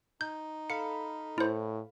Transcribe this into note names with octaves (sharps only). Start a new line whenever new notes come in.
D#4 G6
A4 F5 B5 C#7
A2 E4 C5